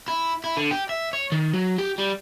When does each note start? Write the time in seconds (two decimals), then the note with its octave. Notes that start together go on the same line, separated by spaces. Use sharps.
0.08 E4
0.44 E4
0.57 D3
0.71 G4
0.89 E5
1.13 C#5
1.32 D#3
1.54 F#3
1.78 G4
1.98 G3